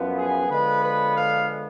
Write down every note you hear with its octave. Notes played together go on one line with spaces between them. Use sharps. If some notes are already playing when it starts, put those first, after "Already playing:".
Already playing: F#2 F3 B3
G#4
D3 F3 G#3 B3 B4
B4
F5